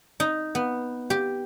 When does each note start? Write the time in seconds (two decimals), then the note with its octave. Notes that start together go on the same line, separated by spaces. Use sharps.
0.20 D#4
0.55 B3
1.10 G4